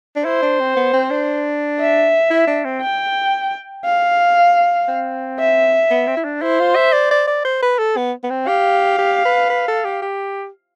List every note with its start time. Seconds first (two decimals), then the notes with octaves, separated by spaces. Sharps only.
0.16 D4
0.24 E4 C5
0.43 D4
0.60 C4
0.77 B3
0.93 C4
1.10 D4
1.80 E5
2.31 E4
2.47 D4
2.65 C4
2.81 G5
3.85 F5
4.88 C4
5.39 E5
5.90 B3
6.07 C4
6.17 E4
6.25 D4
6.42 E4 C5
6.60 F4
6.76 E5
6.93 D5
7.11 D5
7.27 D5
7.45 C5
7.62 B4
7.79 A4
7.97 B3
8.24 B3
8.30 C4
8.47 G4 F5
8.99 G4
9.25 B4
9.50 B4
9.68 A4
9.84 G4
10.02 G4